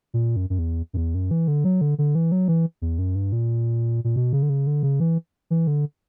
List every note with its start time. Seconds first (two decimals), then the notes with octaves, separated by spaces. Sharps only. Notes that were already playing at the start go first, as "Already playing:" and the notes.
0.14 A#2
0.36 F#2
0.50 F#2
0.59 E2
0.93 F#2
0.97 E2
1.15 F#2
1.31 E3
1.48 D3
1.64 F#3
1.81 D3
1.98 D3
2.15 E3
2.32 F#3
2.48 E3
2.82 E2
2.99 F#2
3.15 G2
3.32 A#2
4.04 A#2
4.16 B2
4.33 C#3
4.43 D3
4.50 C#3
4.67 D3
4.83 C#3
5.00 E3
5.50 E3
5.67 D3